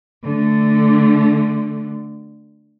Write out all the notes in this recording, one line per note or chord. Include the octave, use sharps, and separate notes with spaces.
D3 A3